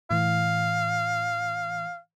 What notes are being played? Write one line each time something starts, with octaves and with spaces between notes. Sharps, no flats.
A2 E3 F5